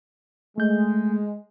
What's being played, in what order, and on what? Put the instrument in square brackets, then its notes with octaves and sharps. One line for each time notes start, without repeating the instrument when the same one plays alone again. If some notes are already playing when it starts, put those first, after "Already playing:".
[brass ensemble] G#3 [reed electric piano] A3 G6